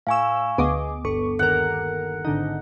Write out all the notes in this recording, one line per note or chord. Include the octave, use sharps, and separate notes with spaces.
A2 F5 G#5 C#6 E6
D2 B3 G#4 D#5 D6
G1 A4 C#6
G1 D#2 A#4 F#5
G#1 D3 D#4